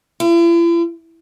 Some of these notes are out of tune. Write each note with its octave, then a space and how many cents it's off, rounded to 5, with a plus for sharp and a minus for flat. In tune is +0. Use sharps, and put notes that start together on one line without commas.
E4 +45